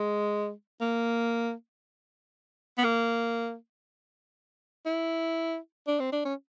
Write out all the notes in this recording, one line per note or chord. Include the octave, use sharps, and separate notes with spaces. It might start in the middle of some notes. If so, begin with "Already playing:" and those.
Already playing: G#3
A#3
B3
A#3
E4
D4
C4
D4
C#4